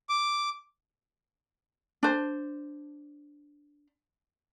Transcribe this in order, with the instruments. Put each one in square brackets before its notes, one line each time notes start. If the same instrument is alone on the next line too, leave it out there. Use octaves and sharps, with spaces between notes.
[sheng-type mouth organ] D6
[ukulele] D4 C5